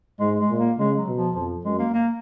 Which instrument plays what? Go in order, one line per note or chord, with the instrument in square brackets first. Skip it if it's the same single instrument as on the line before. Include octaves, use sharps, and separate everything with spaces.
[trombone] G#2 [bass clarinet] G#3
[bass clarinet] G#3
[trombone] A#2
[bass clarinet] A#3
[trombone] C#3 [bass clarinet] G#3
[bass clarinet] F#3
[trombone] B2
[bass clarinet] F3
[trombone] F2 [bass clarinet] F3
[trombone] F#2 [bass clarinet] G#3
[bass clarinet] A#3
A#3